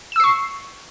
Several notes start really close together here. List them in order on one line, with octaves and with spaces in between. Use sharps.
E7 E6 C7 C#6